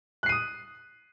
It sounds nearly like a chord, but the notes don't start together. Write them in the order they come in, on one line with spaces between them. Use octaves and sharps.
F#6 C7 D#7 D#6